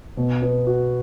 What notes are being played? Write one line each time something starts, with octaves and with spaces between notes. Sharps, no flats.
B2
B3
F#4